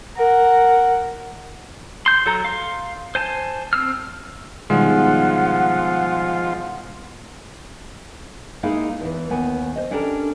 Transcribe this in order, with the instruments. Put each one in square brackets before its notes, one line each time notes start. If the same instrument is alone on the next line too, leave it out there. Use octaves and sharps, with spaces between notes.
[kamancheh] A#4 F#5
[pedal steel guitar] C6 G6
F#3 A4 A#5
F5 C6
C5 G#5 A5
C4 E6 F6
[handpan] B2 D#3 G3 [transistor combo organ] F3 F4 [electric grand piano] G#3 [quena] F#5
[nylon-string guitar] G#3 A#3 D#4 E4 G#4 F5
E2 E3
D#2 B3 G#5
C5 D#5
C#4 D4 G4 A4 A#4